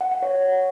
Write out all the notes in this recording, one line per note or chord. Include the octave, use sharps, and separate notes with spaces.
F#5
F#5
C#5